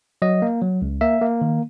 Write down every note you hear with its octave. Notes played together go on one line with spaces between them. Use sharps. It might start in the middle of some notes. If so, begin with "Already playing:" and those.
F#3 D#5
A#3
F#3
C#2
A#3 E5
A#3
D#3